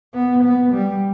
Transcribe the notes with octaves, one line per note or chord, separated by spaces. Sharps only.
B3
B3
G3